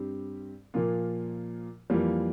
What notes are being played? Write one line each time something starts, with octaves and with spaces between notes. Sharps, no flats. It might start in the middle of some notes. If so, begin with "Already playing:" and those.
Already playing: G2 G3 C4 G4
A#2 F3 A#3 F4
F2 E3 G3 A#3 F4